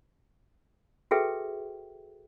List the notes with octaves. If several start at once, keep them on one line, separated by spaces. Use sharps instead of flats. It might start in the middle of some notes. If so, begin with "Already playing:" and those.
F#4 G#4 A4 B4 E5 G5